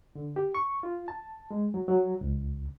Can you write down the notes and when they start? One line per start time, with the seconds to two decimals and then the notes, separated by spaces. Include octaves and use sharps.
0.15 D3
0.36 G4
0.55 C#6
0.83 F4
1.08 A5
1.51 G#3
1.74 F#3
1.88 F#3
2.21 C#2